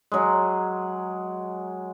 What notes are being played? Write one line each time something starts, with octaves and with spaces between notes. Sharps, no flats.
F#3 G#3